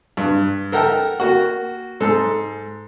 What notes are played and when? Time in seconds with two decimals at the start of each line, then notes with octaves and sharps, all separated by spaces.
0.17 G2
0.72 A4 A#4 F#5 G5 A5
1.20 A#3 F#4
2.00 G#2 A4